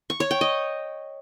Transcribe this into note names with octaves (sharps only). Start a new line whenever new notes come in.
C#6
C#5
G5
D#5